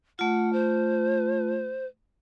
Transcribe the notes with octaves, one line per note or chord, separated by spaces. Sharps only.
A3 F4 F#5
C5